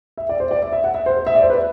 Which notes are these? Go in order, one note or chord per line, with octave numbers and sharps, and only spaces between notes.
E5
D5
C5
D5
E5
E5
F#5
E5
C5
E5
D5
C5
B4